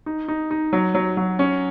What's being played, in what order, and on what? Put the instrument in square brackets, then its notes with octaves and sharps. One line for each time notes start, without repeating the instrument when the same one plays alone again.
[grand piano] D#4
D#4
D#4
F#3
F#3
F#3
C#4